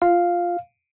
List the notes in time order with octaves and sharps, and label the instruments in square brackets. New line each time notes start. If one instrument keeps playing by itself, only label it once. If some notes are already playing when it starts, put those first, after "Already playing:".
[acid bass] F4 [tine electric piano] F5